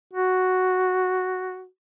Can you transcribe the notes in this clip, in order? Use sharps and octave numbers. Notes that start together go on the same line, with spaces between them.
F#4